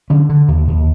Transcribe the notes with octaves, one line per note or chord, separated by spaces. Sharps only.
D3 C#4
D3
D#2
D#2